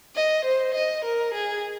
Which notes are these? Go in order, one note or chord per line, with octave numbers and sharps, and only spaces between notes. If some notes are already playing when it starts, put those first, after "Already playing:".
D#5
C5
D#5
A#4
G#4